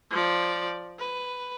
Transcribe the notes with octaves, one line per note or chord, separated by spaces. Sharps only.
F3 D5
B4